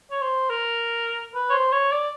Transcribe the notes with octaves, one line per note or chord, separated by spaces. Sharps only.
C#5
C5
A#4
B4
C#5
C5
C#5
D5